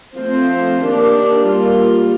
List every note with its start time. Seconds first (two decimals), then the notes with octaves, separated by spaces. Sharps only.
0.16 F3 A3 C4 F4 C5
0.81 D#3 A#3 D4 G4
1.44 G3 A#3 F4